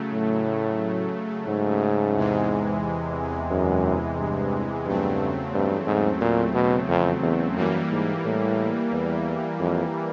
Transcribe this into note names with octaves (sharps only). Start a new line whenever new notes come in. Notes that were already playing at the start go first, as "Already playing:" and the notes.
Already playing: C#3 F#3 A3
A2
G#2
E2 C3 E3 G#3
F#2
G2
E2 G2 C#3 F#3 A3 C4
G2
G#2
A#2
B2
F2
E2
F#2 E3 G3 A#3
G#2
A2
E2
F2